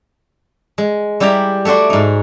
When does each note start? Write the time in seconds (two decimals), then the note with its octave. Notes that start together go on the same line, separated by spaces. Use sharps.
0.78 G#3
1.20 G3 E4 G4 G5 A#5 B5
1.65 A3 E4 F#4 D5 C6
1.90 G#2 D#4